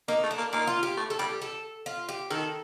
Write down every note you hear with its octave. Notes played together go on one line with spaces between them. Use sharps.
A#3 D#4
A3
D4
A#3
A#3 D#4
F4
G4
A3
A4
G3 G4
A4
F4
G4
D#3 A4